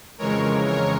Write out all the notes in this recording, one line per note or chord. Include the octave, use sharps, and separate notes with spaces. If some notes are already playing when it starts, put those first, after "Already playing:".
F2 C#3 E3 G#3 A#4 C#5
A#4 C#5